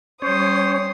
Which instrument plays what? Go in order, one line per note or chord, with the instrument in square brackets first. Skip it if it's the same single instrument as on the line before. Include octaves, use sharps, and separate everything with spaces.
[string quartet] G3 C6 D#6 [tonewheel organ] C#4 C#5 [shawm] C5